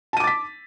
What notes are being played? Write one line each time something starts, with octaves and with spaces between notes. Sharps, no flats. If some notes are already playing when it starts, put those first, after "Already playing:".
A5 D6 A6 B6 D#7